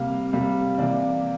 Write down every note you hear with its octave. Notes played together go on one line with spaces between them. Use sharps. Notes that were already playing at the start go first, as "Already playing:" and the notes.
Already playing: C3 G3 A#3 F5
C3 G3 A#3
C3 E3 A#3 D5